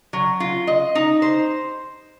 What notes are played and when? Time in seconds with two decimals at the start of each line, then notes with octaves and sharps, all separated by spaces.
0.13 F#3
0.40 F4
0.67 D#5
0.95 D#4
1.22 C5